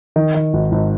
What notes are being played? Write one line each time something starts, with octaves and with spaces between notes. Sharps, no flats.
D#3
D#3
G#1
G#1